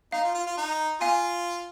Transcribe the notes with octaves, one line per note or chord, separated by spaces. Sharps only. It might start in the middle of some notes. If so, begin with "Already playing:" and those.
D#4 F5
F4
F4
F4
D#4
F4 F5 G#5